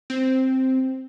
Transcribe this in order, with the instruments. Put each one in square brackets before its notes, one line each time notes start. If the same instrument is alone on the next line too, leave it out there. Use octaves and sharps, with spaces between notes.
[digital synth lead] C4